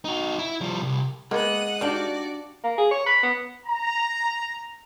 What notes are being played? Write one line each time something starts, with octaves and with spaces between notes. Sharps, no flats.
D#4 F#4
E4
F3 G3
C2
G#3 A#3 B3 F#5 D#6 F#6
D4 D#4 F#4 G4 D5 F5
A#3
G#4
C#5
B5
B3
A#5